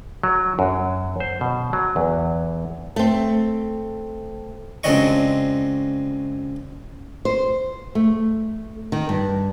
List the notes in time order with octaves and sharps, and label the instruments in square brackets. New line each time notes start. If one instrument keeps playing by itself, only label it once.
[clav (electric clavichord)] F#3
F#2
C5
B2
F#3
E2
[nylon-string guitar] A3 C4
[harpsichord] C#2 F#2 C4 D4 D#5 C#6
[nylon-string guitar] C5
A3
D#3
G2